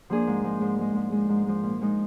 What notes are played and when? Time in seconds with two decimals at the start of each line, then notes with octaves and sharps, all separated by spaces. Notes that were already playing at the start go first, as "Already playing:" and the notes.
0.10 F3 A#3 D4 G#4
0.27 G#2
0.44 F3 G#3
0.61 G#2
0.78 F3 G#3
0.95 G#2
1.12 F3 G#3
1.29 G#2
1.46 F3 G#3
1.63 A#2
1.81 F3 G#3 D#4